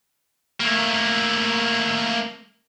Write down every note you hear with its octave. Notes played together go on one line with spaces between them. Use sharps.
A3 A#3